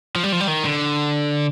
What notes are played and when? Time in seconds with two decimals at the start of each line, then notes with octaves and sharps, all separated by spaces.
0.16 F3
0.23 G3
0.32 F3
0.40 G3
0.48 D#3
0.65 D3